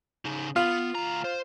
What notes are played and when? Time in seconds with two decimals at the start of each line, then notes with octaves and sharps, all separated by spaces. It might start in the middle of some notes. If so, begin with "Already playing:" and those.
0.25 C#3 D#4
0.56 B3 F4
0.95 D2 A#5
1.25 C5